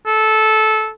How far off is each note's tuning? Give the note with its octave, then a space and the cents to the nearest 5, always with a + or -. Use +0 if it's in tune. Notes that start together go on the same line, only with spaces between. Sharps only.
A4 -15